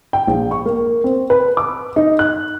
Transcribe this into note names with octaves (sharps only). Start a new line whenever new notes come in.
G5
A#1
C#6
A#3
C4
B4
D6
D#4
F#6